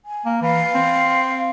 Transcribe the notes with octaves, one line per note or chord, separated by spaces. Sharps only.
G#5
A#3
E3 F5
C4